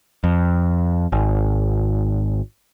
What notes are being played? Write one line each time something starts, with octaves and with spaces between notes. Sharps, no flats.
F2
G#1